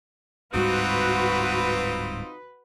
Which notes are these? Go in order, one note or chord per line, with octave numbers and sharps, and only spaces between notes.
D1 G#2 G3 C4 D#4 F4 F#4 B4